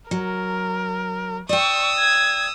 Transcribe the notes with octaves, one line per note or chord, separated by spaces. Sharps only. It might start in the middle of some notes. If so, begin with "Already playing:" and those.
F#3 A#4
D5 G5 C#6 D#6 E6
G#6